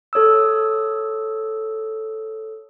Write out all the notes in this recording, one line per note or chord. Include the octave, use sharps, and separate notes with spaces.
A4 C#5 D#6 E6